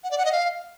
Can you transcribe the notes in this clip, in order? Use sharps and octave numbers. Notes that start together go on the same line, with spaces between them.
F#5
D5
F#5
D#5
F5